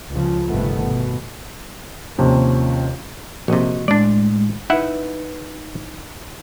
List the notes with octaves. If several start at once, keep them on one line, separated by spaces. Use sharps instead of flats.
C#2 C#3 F3
G1 C3 D#3 A3 B3
B2
D#2 C3 F3 C#4
A#1 C3 F#4 D#5
A2 G#3 D4 D5
D#4 E4 B4 E5 F#5